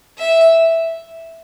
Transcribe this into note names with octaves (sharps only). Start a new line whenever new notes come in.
E5